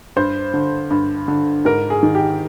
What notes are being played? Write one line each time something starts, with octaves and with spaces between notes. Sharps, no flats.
G2 C5
D3
G2
D3
G#2 A#4
G#4
D#3
G4